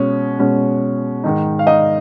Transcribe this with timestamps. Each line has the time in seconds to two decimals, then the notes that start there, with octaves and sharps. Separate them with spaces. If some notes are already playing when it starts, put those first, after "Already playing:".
Already playing: B2 G#3 C#4
0.39 B2 G#3 C#4
1.24 G#2 D#3 G#3 D#4
1.59 F5
1.67 D#4 D#5